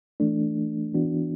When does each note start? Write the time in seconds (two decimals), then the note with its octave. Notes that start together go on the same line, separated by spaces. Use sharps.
0.20 E3 A3 D4
0.94 E3 B3 D4 F#4